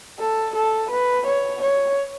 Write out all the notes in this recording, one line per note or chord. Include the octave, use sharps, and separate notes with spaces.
A4
A4
B4
C#5
C#5